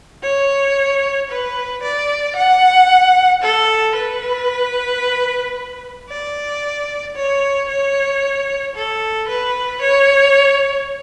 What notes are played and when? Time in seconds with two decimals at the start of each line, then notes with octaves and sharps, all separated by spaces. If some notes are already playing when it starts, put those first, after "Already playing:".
0.23 C#5
1.29 B4
1.83 D5
2.36 F#5
3.42 A4
3.96 B4
6.09 D5
7.16 C#5
7.69 C#5
8.75 A4
9.29 B4
9.82 C#5